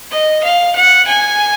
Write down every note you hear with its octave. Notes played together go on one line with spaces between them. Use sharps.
D#5
F5
F#5
G#5